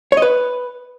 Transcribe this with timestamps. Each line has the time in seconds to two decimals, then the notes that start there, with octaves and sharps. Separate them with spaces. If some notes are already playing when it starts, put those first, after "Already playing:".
0.12 C#5
0.17 D#5
0.22 B4